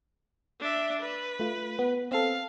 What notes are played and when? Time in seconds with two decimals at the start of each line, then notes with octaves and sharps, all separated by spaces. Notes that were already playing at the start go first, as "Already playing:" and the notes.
0.60 D4 E5
1.02 B4
1.40 A3 F4
1.79 B3
2.11 C4 A4 F5